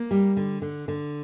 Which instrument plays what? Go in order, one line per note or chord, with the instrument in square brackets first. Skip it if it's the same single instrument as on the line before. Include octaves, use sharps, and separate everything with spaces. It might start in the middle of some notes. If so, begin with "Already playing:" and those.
Already playing: [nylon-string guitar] A#3
G3
D3
D3
D3